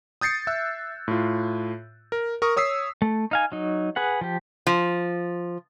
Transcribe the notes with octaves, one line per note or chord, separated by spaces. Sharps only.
D#6 G6 A6 C7 C#7
E5 E6 F#6
A2 F4
A#4
A#4 C#6 D#6
C#5 D#6 E6 B6 C7
A3
D#4 F5 G#5
F#3 D#4
G#4 B4 F#5
F3 G4
F3